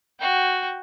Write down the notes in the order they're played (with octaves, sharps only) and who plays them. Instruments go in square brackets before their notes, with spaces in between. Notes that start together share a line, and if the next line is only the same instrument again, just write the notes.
[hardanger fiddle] F#4 G5